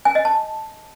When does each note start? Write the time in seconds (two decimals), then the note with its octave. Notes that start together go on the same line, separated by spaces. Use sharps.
0.05 G#5
0.15 D#5
0.25 A5